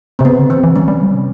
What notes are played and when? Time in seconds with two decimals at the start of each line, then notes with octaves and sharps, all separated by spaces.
0.19 C3 C4
0.24 C#3 B3
0.38 D3
0.50 E3 C4
0.64 E3
0.75 G3 C#4
0.88 G3
1.02 F#3
1.14 C3